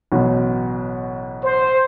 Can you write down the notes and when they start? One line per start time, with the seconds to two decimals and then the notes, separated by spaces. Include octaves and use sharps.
0.12 A1 B2 F#3
1.45 C5